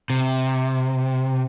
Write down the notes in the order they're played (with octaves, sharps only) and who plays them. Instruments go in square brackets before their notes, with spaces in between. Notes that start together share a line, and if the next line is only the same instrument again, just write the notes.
[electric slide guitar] C3